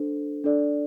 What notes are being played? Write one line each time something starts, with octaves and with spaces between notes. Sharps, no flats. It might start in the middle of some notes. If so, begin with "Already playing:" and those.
Already playing: D4 A4 C5
D4 A4 D5